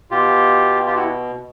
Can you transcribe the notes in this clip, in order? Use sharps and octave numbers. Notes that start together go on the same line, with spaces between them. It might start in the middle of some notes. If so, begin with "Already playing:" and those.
B2 F4 G4
F4 G4
E4 F#4